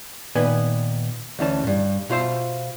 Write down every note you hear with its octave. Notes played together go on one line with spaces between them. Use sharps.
A#2 D#3 B3 B4 G#5
D2 E3 C#4 A5
G2 A#2
B2 F4 C5 E5